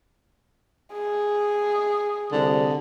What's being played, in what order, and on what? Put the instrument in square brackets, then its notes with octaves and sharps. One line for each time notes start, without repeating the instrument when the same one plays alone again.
[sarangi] G#4
[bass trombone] C2 [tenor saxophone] D3